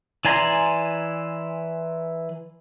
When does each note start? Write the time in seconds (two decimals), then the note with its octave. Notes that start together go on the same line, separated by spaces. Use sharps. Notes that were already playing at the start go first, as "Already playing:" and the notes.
0.25 E3 D5 G#5 A#5 C6